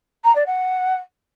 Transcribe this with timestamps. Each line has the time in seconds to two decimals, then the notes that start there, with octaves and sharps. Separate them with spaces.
0.24 A#5
0.35 D5
0.47 F#5